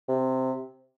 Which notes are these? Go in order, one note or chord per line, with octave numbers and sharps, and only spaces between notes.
C3